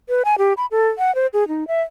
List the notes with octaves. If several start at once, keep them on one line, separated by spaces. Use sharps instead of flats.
B4
G#5
G4
B5
A4
F#5
C5
G#4
D#4
E5